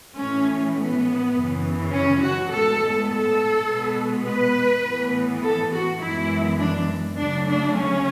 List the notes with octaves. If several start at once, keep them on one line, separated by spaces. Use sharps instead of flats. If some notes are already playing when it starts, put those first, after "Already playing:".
A2 E3 A3 C#4
B3
F#2 C#3 E3
C#4
F#4
A2 G#3 B3 A4
A4
B2 G#3 B3
B4
A2 E3 B3
A4
F#4
F#2 E3 G#3 B3 E4
D4
D2 C#3 F#3 A3 D4
D4
C#4